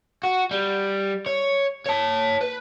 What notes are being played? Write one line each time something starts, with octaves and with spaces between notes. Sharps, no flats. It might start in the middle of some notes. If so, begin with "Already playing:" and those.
F#4
G3
C#5
C#5 A5
B4